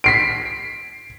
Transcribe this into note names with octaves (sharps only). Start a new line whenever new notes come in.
B6 C7 D7